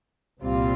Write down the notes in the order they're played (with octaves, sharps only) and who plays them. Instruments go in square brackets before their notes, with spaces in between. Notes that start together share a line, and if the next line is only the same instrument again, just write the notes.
[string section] C2 A#2 G3 C4 F4